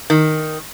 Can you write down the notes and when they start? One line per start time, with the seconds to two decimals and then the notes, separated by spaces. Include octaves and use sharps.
0.10 D#3